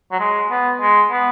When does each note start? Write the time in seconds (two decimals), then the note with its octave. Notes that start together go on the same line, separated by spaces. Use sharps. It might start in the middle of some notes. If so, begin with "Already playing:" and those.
0.11 F#3
0.20 G#3
0.50 B3
0.80 G#3
1.11 B3